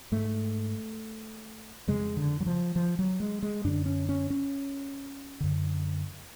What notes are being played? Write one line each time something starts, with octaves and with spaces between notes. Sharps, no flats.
G#2 A3
F2 C#3 G#3
D3
F#3
F3
F3
F#3
G#3
G#3
F#2 D3 D4
C#4
C#4
C#4
F#2 D3